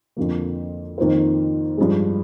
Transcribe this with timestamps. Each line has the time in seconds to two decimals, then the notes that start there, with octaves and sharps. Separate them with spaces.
0.17 F2 D3 F3 A#3
0.98 F2 D#3 A#3 F4 C5
1.78 G2 F3 G#3